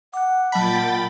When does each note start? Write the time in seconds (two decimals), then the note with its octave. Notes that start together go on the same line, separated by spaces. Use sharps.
0.14 F#5 D6 F#6
0.52 A#2 F#3 D#5 G5 A5 B5 A6